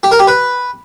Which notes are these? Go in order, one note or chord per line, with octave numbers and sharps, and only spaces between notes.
G4
A#4
G4
B4